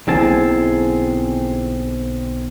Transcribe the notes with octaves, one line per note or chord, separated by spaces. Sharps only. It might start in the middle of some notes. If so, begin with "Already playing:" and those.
B1 D3 A#3 C4 E4 G#4 A5